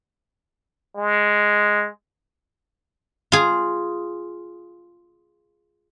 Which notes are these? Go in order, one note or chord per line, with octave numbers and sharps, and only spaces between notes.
G#3
F4 G#4